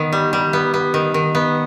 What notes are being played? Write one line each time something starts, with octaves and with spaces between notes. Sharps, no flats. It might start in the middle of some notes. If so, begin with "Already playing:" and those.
Already playing: D#3 B3
G3
G3
B3
B3
D#3
D#3
B3